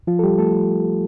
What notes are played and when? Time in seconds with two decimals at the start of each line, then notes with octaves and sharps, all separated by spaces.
0.07 F3 F4
0.19 A4
0.24 G3 G4
0.39 A3 A4